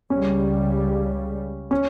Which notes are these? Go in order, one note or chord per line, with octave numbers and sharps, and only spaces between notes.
C#2 C#3 G3 C#4
C#4